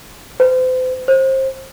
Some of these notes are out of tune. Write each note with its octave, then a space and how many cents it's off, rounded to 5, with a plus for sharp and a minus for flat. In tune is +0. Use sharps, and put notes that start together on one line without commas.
C5 -40
C5 +25